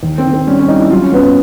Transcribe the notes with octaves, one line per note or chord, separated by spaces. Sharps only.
D#2
C4
D#3
C4
G3 C#4
C#4
G3 D#4
E4
F#3 F4
C#4
F#2 B3